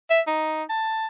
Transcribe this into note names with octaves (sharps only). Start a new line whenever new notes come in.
E5
D#4
A5